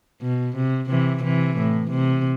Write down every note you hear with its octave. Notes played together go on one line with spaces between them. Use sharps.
B2
C3
C3 E3
C3 E3
A2
C3